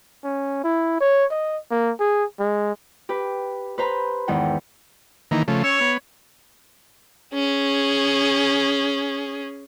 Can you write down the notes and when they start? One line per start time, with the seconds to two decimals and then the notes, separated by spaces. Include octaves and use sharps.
0.24 C#4
0.64 E4
1.01 C#5
1.31 D#5
1.71 A#3
2.00 G#4
2.40 G#3
3.09 G4 B4
3.78 B4 C5 A#5 B5
4.28 E2 G#2 D#3 F#5 G5
5.31 D#3 E3 A#3
5.48 C#3 F3 A3
5.63 C#4 C#5 E6
5.81 B3
7.34 C#4 G#4